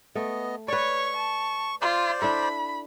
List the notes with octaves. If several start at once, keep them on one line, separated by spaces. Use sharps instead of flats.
A3 B3 D#5
B4 C#5 D5 C#6
A5
F4 C5 D5
D4 E4 A4 B5